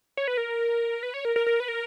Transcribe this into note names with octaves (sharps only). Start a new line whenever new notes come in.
C#5
B4
A#4
B4
C#5
A#4
A#4
A#4
B4
A#4